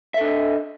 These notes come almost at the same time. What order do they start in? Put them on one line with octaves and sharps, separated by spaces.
E5 A4 D4 D#5